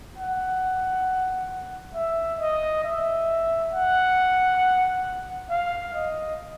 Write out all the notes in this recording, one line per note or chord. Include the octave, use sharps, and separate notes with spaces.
F#5
E5
D#5
E5
F#5
F5
D#5